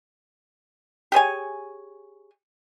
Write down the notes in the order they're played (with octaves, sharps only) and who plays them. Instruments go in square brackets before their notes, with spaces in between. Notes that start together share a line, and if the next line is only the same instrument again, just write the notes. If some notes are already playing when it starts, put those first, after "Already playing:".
[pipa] G4 G#4 C#5 G#5